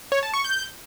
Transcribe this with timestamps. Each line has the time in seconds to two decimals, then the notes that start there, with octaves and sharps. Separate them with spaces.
0.12 C#5
0.23 A5
0.34 C#6
0.44 G6